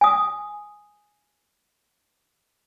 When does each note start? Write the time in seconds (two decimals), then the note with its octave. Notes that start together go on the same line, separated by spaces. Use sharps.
0.01 G#5 D#6